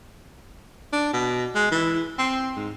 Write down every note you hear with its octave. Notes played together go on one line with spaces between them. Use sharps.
D4
B2
G#3
E3
C4
G#2